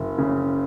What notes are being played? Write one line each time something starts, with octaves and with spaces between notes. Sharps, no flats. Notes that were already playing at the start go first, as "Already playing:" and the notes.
Already playing: F#1
C#3